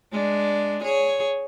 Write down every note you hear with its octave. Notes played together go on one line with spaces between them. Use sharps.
G#3 D4
G#4 C#5